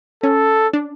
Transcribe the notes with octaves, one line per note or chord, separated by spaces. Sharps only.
C#4 A4
D4